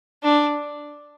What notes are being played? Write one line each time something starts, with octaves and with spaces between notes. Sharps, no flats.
D4